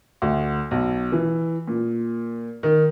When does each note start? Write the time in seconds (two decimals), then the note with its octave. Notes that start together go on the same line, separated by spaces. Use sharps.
0.22 D2
0.71 B1
1.12 E3
1.67 A#2
2.63 D#3